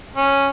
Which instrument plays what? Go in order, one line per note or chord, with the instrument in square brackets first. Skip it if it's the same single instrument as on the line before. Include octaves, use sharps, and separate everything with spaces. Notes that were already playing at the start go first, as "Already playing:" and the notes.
[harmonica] C#4